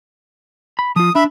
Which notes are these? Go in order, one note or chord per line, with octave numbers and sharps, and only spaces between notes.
B5
F3 F4 D#6
D4 E5 B5